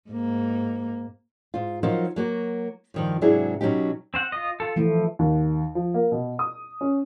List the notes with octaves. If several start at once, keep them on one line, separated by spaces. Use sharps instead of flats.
G#2 A#3
G#2 F4
F3 F#3 D#4 F4 A#4 D#5
F#3 A#3 F#4
G2 D#3 F3
G#2 C3 F#3 D4 E4 G#4
B2 F#3 C#4 D#4 G4
C4 C5 F#5
F4 D#5
F4 A4
E3 F3 A3 E4
D#2
F3
A#3
B2
D#6
C#4